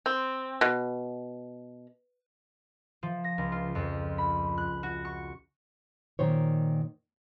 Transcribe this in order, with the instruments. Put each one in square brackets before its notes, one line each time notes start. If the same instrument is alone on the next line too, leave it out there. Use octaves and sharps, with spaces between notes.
[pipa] C4
B2
[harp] F3
A#6
C#2
F4
F2
B5
F#6
F#4
C#6
[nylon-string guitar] A#2 D#3 C5 C#5